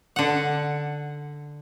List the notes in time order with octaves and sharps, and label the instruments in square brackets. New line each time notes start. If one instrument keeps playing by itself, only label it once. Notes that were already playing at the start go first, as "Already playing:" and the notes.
[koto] D3 F#5